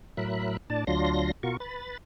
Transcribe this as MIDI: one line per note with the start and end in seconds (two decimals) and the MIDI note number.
0.17 0.57 45
0.17 0.57 54
0.17 0.57 70
0.17 0.57 76
0.17 0.57 83
0.17 0.57 90
0.70 0.84 45
0.70 0.84 62
0.70 0.84 74
0.70 0.84 81
0.87 1.31 38
0.87 1.31 54
0.87 1.31 62
0.87 1.31 65
0.87 1.31 84
0.87 1.31 94
1.43 1.57 47
1.43 1.57 65
1.43 1.57 66
1.43 1.57 70
1.43 1.57 85
1.60 1.97 71
1.60 1.97 83
1.60 1.97 93